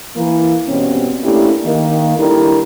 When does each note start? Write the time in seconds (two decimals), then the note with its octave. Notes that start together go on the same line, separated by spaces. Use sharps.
0.17 E3 A#3
0.68 G2 B2 C4 C#4
1.24 A3 A#3 C#4 D4 E4 G4
1.65 D#3 A#3
2.17 G3 D4 E4 A4 A#4